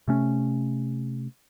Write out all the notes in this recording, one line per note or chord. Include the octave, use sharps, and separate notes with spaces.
C3 A3 C#4